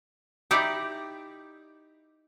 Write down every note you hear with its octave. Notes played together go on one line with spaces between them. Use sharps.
D#4 E4 G4 D5